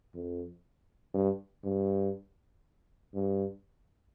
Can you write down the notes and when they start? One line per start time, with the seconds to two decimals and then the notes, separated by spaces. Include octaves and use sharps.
0.14 F2
1.14 G2
1.64 G2
3.14 G2